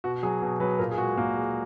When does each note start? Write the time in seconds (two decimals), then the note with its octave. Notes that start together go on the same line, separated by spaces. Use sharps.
0.04 B2 F#4
0.23 F#3 G#4
0.42 B2
0.60 F#3 B4
0.79 A#2 A#4
0.91 G#4
0.98 G#3 F#4
1.17 A#2 A#3
1.36 G#3